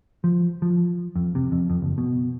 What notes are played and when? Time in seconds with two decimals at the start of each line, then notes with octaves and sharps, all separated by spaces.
0.24 F3
0.62 F3
1.16 F2
1.35 C3
1.52 F2
1.70 F2
1.82 F#1
1.98 B2